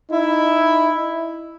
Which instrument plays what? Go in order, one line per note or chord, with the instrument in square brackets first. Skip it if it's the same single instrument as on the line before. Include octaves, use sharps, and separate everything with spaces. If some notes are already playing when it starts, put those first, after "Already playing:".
[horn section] D#4 E4